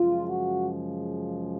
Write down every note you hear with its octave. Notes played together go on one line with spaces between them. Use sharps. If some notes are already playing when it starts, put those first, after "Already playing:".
Already playing: F#2 C#3 F3 G#3 F4
F#4